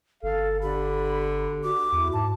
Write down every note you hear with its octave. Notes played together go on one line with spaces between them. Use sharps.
G1 A4 F5
D3 G4 B5
F#4 D6
E2 E4
G#2 A5